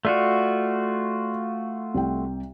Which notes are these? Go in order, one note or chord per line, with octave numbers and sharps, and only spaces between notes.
A3 F4 F#4 D5
C2 G5